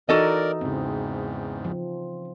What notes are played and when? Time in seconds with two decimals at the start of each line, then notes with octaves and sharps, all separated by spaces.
0.09 E3 D#4 F#4 A4 A#4 D5 D#5
0.61 E2 G#2 C#3 C4
1.65 F3